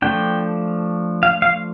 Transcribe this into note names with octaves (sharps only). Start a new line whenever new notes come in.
F3 A3 D4 G5
F5
F5